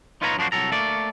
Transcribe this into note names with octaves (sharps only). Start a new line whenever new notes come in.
D#4 F4 B4 C#5 F#5 A#5
F#2 F3 D4 F#4 C5
C2 A#2 F#3 A4 A#5
A3 A#3 D5